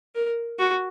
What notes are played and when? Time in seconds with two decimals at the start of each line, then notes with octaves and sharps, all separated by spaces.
0.15 A#4
0.59 F#4